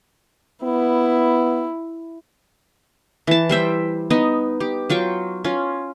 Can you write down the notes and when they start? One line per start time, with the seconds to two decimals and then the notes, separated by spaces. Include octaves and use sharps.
0.63 B3 E4
3.27 E3 A5
3.49 G3 C5 E5 G5
4.10 B3 D#4 D#5
4.60 G4
4.90 F#3 F4 G5 C#6
5.44 C#4 F4